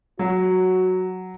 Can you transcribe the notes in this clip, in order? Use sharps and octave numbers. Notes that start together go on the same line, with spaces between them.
F#3 F#4